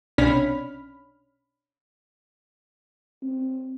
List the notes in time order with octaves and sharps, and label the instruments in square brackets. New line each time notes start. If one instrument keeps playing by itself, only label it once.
[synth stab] B1 C3 C#4 D4 B5 F6
[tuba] C4